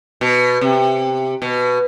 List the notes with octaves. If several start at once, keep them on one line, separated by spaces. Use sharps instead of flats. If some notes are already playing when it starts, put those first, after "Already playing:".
B2
C3
B2